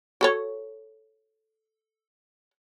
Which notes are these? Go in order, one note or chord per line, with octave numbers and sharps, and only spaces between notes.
F#4 A4 C#5